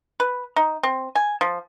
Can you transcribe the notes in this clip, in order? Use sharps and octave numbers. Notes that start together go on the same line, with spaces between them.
B4
D#4
C4
G#5
F3